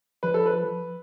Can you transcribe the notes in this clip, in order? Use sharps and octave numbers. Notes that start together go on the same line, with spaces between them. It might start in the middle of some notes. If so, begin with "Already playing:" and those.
F3 B4
A4
B4